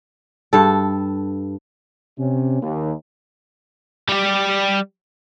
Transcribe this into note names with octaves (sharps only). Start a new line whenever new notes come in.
G2 A4
C3 C#4
D#2
G3 G4